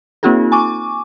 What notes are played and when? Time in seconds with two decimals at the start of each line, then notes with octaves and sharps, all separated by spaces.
0.23 A#3 C4 D#4 F4 G4 A4
0.52 G#5 C#6 D6